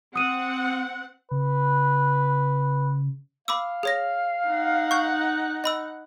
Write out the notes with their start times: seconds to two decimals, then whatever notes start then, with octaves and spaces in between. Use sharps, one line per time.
0.16 C4 F#5 D#6 D#7
1.31 C#3 B4
3.48 F5 B5 D6 E6
3.83 G#4 C#5 A#6
4.48 D#4 F#5
4.91 C#6 G6
5.64 D#5 B5 E6